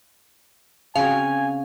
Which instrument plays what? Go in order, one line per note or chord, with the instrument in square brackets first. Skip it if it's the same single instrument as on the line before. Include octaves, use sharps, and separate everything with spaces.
[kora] C#3 C4 F#4 [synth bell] F5 [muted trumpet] G#5